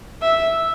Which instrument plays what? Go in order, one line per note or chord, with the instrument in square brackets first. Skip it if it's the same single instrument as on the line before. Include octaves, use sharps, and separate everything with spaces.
[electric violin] E5